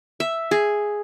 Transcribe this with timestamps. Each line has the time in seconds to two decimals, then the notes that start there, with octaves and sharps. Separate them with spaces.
0.20 E5
0.51 G#4